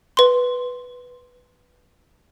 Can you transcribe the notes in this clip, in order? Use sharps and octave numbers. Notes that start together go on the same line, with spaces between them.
B4 C6